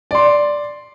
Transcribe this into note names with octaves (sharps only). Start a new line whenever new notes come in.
D5 C6